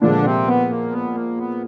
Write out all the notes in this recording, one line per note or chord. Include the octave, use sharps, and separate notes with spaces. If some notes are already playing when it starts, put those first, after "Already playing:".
A#2 D3 F3 G#3 D4
C3 C4
B3
A#3
B3
A#3
B3